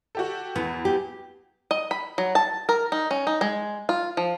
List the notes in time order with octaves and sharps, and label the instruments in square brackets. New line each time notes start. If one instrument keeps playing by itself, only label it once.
[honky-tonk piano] F#4 G4 A4
[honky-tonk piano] E2 [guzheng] B3
[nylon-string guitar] G4
[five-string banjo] D#5
B5
F#3
A5
A#4
D#4
C#4
D#4
G#3
F4
F3